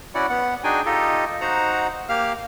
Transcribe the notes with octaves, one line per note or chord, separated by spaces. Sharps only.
C#4 E4 F#4 D5 F#5
B3 F#5
D4 D#4 F#4 G#4 G5 G#5
D#4 F4 G4 A4 D#5
D#4 F#4 C5 F#5 A#5
A#3 G4 F5 F6